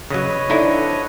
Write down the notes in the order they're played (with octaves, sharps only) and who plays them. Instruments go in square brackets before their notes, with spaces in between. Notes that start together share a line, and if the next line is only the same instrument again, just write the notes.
[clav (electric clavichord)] C#3 F#3 [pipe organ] B4 C#5 D#5
[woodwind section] F2 D3 [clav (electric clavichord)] D#4 E4